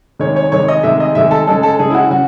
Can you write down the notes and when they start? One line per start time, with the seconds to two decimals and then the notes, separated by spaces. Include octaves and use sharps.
0.19 C3 D#3 G#3 C#5
0.36 C#5
0.52 C3 D#3 G#3 C#5
0.68 D#5
0.83 C3 D#3 G#3 E5
1.00 D#5
1.15 C3 D#3 G#3 E5
1.31 A4
1.47 C#3 G#3 A4
1.63 A4
1.79 C#3 G#3 G#4
1.90 E4
1.95 F#4
2.10 C#3 F#4